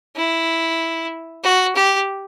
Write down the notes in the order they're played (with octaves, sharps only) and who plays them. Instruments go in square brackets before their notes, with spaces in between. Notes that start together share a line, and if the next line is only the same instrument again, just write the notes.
[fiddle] E4
F#4
G4